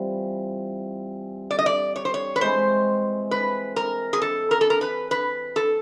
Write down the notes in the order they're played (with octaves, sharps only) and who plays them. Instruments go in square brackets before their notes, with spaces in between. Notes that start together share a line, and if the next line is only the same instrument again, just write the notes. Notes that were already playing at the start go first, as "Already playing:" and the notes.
Already playing: [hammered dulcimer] E3 G3 C4 F4
[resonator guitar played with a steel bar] D5
D#5
D5
C#5
C5
C#5
B4
[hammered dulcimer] E3 G#3 C4 [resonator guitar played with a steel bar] C5
[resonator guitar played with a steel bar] B4
A#4
G#4
A4
A#4
A4
A#4
B4
B4
A4